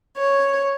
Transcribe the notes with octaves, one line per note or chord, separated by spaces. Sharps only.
C#5